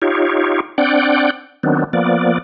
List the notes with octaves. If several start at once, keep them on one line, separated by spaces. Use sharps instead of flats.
D#4 F4 G4 C#5
C4 D4 D5 F#5 G5
D#3 F#3 B3 C4 D4
F3 A#3 B3 D5